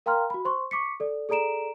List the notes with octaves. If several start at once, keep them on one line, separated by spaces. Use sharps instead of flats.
A#4 F5 G5 A#5 C6 F6
F#4 B5
C5 C6 C#6
C#6 D6 B6 C#7
A4 D5
G#4 A4 D5 A#5 D7 E7